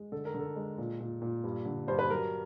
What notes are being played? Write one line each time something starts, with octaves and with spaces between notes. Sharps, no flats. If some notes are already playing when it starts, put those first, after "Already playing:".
Already playing: G#3
D3 A4
A#4
D3
A4
G#3
A#2
A#2
A#2
G2
D3
G2 C5
B4
F#3 A#4